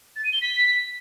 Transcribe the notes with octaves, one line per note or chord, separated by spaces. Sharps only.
A6
D#7
G7
B6